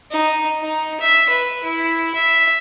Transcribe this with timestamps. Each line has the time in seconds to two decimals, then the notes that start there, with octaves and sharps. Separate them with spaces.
0.11 D#4
0.62 D#4
1.00 E5
1.29 B4
1.63 E4
2.15 E5